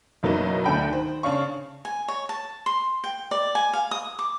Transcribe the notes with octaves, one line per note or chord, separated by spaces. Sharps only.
F#1 B2 F#3 A#3 D#4
D2 D3 G5 B5
D#3 C5
C#3 D4 C#5 F5 C#6
G#5
C#5
A5
C6
G5
D5
G#5
F5
D#6
D6